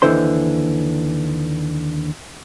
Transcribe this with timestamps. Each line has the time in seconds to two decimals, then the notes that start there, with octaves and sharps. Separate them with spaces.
0.02 D#2 D3 E3 C5 C6